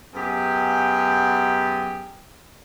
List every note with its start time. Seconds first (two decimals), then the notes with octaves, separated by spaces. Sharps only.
0.14 F#2 B3 G4 G#4